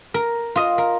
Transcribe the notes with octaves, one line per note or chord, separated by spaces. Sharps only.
A#4
F4 D#5
A#4